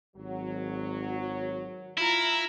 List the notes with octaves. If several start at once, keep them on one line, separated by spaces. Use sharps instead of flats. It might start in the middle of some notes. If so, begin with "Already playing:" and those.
G#1 F#3
E4 F4 A#5